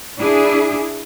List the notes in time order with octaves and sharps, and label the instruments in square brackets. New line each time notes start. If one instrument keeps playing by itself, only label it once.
[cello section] D4 E4 G#4